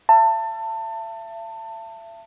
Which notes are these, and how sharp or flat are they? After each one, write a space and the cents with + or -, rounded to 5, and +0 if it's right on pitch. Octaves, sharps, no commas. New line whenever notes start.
E5 +35 A5 +25